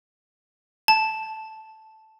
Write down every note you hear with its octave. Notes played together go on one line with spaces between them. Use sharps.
A5